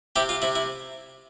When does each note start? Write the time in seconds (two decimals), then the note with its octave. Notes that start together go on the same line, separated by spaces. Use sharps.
0.16 C3 E4 G4
0.29 F4
0.42 C3 E4
0.56 E4